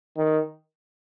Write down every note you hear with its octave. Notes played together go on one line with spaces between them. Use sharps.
D#3